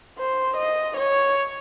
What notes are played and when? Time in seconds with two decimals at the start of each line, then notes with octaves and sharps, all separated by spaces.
0.18 C5
0.57 D#5
0.97 C#5